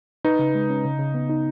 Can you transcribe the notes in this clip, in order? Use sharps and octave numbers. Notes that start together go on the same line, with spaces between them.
D#4 B4
C#3
G#3
C#4
C#3
C#3
B3
D#4